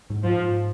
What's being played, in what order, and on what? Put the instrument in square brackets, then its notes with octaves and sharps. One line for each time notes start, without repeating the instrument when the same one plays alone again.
[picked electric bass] G#2
[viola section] F3
[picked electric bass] G#2